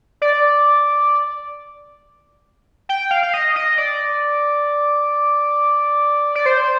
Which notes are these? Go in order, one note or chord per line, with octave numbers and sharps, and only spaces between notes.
D5
G5
F5
F5
D#5
D#5
D5
D5
C5